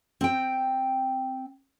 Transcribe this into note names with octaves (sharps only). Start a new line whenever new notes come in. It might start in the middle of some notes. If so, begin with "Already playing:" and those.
C4 G5